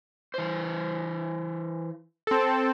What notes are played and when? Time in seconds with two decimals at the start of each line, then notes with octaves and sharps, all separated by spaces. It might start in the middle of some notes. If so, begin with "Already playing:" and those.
0.34 E3 C5
2.27 C4 A4